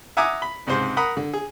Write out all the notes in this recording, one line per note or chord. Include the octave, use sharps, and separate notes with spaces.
E5 F#5 G#5 A#5 D6 D#6
B5
C#2 G#2 C3 C5 C6
A#4 F#5 A#5 B5 D#6
D3
G#4